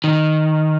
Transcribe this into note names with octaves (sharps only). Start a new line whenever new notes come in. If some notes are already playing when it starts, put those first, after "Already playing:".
D#3